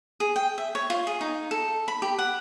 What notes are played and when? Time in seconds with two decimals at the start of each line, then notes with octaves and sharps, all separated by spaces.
0.20 G#4
0.36 G5
0.58 E5
0.75 C#5
0.90 F4
1.07 G#4
1.21 D#4
1.51 A4
1.88 B5
2.02 G4
2.19 F#5